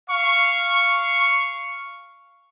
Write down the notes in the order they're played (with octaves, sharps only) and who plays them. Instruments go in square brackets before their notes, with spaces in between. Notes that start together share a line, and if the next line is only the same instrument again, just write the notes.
[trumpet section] F5 C#6